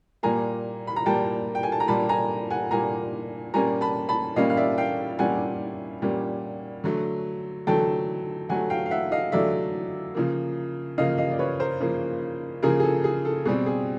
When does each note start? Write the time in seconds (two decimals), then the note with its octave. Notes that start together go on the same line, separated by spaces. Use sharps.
0.23 A#2 G3 A#3 G#5 A#5
0.87 B5
0.96 A#5
1.06 A#2 G3 A#3 G5 A5
1.55 G5
1.63 G#5
1.72 A5
1.80 A#5
1.88 A#2 G3 A#3 A5 B5
2.09 G#5 A#5
2.50 F#5 G#5
2.71 A#2 G3 A#3 G#5 A#5
3.54 A#2 G3 A#3 C#4 G#5 A#5
3.81 A5 B5
4.09 A5 B5
4.36 A#2 G3 A#3 C#4 D#5 F5
4.50 F5
4.57 D5 E5
4.78 F5 G5
5.19 A#2 G3 A#3 C#4 F#5 G#5
6.02 A#2 G3 A#3 C#4
6.84 D3 F#3 A3
7.67 D3 F#3 A3 G5 A5
8.49 D3 F#3 A3 F#5 G#5
8.70 F5 G5
8.86 F5
8.91 E5 F#5
9.12 D#5 F5
9.32 D3 F#3 A3 D5 E5
10.15 C#3 F3 A#3
10.98 C#3 F3 A#3 D#5 F5
11.18 D#5 F5
11.31 D5
11.39 B4 C#5
11.60 A#4 C5
11.80 C#3 F3 A#3
12.63 C#3 F3 A#3 G#4 A#4
12.80 G#4
12.84 A4
13.04 G#4
13.25 A4
13.45 B2 G3 C4 G#4
13.66 G#4